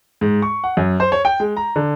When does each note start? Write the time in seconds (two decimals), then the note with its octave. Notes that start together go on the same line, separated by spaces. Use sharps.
0.21 G#2
0.42 C#6
0.64 F#5
0.77 F#2
1.00 C5
1.12 C#5
1.25 G5
1.40 G#3
1.56 A#5
1.76 D3